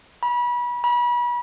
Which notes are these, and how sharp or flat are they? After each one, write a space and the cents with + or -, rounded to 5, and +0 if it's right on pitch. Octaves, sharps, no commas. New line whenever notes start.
B5 -30
B5 -35